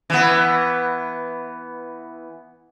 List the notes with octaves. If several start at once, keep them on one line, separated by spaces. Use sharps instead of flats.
E3 B3